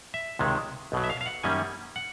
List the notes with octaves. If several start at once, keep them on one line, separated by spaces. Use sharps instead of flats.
E5
C#2 C3 D#3 G#3
B1 B2 F#3
E5
F5
F5
F#5
F#2 D#3 G3 A#3 C#4 G#5
F#5